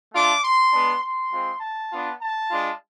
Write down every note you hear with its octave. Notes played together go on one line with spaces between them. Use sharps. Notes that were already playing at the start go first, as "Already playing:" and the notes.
A3 D4 F4 D6
C6
G#3 B3 D4
C6
G#3 C4 F4
A5
B3 D4 F4
A5
G#3 D4 F4